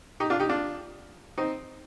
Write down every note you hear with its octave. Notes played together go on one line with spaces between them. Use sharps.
D#4 G4
D4 F4
D#4 G4
D4 F4
C4 D#4